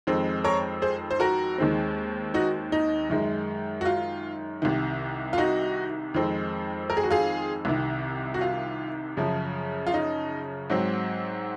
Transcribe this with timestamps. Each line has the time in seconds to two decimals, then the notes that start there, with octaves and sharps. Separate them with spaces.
0.07 F2 D#3 G#3 C4
0.44 A#4 C#5
0.82 G#4 C5
1.11 C5
1.20 F#4 A#4
1.58 D#2 D#3 G#3 C4
2.34 D#4 F#4
2.72 D#4
3.10 F#2 D#3 G#3
3.81 F#4
3.85 F4
4.62 C2 C3 D#3
5.33 F4
5.38 D#4 F#4
6.14 F2 D#3 G#3 C4
6.90 A#4
6.97 G#4
7.03 F#4
7.11 F4 G#4
7.65 C2 C3 D#3
8.34 F#4
8.41 F4
9.17 F#2 C#3 F3
9.87 F4
9.94 D#4
10.70 G#2 F#3 C4